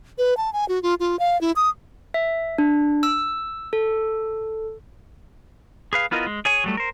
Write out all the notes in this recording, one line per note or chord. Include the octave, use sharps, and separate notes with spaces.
B4
A5
G#5
F#4
F4
F4
F5
E4
D#6
E5
D4
E6
A4
G#4 B4 F5
B3 E4 F4 A#4 D#5
G#3
G#4 C#5 G#5
F#3 G3 A3
A#4 C5